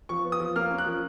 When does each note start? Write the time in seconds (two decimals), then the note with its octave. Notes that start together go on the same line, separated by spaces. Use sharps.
0.09 F3 C#6
0.25 B3
0.32 D#6
0.40 F3
0.56 A#3 F6
0.71 C#4
0.78 F#6
0.86 F3